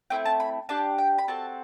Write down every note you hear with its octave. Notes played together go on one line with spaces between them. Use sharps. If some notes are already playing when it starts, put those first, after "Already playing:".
A3 C4 E4 G5
A5
B5
D4 G4 A5
G5
B5
C4 F#4 A4 A5